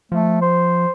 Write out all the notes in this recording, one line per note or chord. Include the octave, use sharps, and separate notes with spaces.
F3 A3
C5